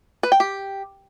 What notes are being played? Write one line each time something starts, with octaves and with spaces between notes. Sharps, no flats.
B4
G5
G4